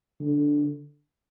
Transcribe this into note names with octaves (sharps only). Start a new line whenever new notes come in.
D3